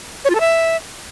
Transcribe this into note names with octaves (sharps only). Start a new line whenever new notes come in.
C#5
F4
A4
E5